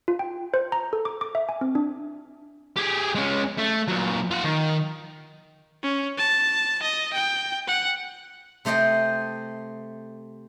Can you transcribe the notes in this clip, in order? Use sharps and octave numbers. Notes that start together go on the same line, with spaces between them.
F4
G5
C5
A#5
A4
D6
D6
E5
G#5
C4
D4
G4 G#4
G#3 C#4
A3
A#2 F#3
F4 F#5
D#3
C#4
A5
D#5
G5
F#5
C3 A3 C5 D#5 G5